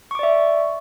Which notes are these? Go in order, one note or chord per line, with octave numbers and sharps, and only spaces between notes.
D5 E5 C#6 D6